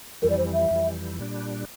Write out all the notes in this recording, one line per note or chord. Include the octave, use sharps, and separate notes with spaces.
F2 E3 G3 A#4
D5
C5
E5
F2 E3 G3
A#2 G3 D4